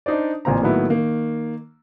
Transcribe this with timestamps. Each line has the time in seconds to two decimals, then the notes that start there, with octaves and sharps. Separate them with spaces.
0.06 D4 D#4 C5 D5
0.45 A1 A#2 C4 A#5
0.62 A2 D#3 F#3 A#3 B3 E4
0.90 D#3 A#3